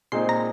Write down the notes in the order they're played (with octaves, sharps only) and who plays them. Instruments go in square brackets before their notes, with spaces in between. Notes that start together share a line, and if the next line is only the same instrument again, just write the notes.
[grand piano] A#2 G#3 C4 D#4 [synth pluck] C6
[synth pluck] A#5